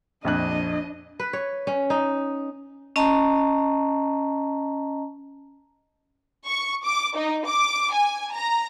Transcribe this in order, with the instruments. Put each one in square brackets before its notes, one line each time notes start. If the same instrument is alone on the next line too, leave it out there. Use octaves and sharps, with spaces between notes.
[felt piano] A#1 F2 F#6 [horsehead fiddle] D4 D#5
[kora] B4
C#5
C#4
D#4
[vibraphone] C#4 D#5 A5 A#5
[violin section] C#6
D6
D#4
D6
G#5
A#5